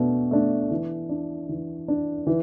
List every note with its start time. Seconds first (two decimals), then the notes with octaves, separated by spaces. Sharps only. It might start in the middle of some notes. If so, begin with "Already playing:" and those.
Already playing: B2 A3 D4
0.31 A3 D4
0.71 E3
1.09 D4
1.49 E3
1.88 D4
2.27 E3